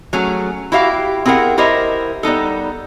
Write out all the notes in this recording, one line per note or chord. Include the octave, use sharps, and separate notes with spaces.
F#3 A3 C#4 G#4
E4 F#4 G4 E5 F5
C4 E4 G#4 A#4 F#5
E4 G4 A#4 C5 D#5 E5
G3 B3 D#4 A4